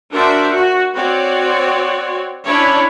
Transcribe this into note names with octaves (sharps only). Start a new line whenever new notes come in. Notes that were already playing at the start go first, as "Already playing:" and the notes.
D4 F#4 A#4 C5 D5 E5
F#4
C4 F#4 C#5 D5
C#4 D4 E4 C#5 D5